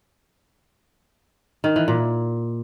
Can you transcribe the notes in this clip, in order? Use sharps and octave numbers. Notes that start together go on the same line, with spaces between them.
D#3
E3
A#2